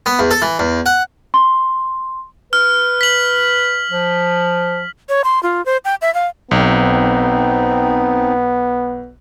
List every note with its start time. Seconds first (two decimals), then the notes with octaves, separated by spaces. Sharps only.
0.06 B3
0.19 E2
0.31 A4
0.42 E3
0.59 E2
0.86 F#5
1.34 C6
2.53 B4 F6
3.01 B6 F#7
3.91 F3
5.09 C#5
5.24 C6
5.43 F4
5.66 C5
5.85 G5
6.02 E5
6.14 F5
6.51 B1 B3 C4 D#4